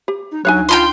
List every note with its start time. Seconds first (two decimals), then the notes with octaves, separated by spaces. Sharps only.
0.08 G4
0.32 D#4
0.45 D2 F#3 D#4 C#5 F5 G#5 F#6
0.69 F4 G5 A#5 C6